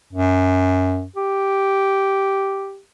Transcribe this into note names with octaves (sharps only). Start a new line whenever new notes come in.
F#2
G4